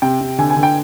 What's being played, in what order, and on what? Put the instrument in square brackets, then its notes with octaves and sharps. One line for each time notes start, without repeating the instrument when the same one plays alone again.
[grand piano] C3 [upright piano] G5
[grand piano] C3
[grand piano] D3 [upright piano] G#5
[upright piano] G#5
[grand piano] D3
[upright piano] G5